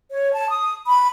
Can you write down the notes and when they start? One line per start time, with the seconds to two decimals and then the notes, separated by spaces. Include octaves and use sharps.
0.11 C#5
0.33 A5
0.50 D#6
0.87 B5